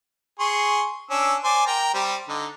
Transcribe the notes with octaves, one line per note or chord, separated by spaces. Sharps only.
G#4 C6 C#6
C#4 D4 E6
C5 D5 G#5
A#4 G5 A#5
G3 C4 G4
D3 D#4